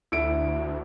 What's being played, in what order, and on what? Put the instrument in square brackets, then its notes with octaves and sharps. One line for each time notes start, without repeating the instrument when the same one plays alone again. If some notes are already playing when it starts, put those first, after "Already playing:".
[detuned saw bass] D2 [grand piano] E4 D7